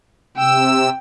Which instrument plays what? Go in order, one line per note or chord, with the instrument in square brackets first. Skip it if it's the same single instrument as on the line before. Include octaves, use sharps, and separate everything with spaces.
[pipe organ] C3 E6 [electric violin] G5